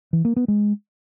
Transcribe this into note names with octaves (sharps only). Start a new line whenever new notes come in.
E3
A#3
B3
G#3